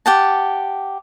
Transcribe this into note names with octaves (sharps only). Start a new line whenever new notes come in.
G4 F#5 A5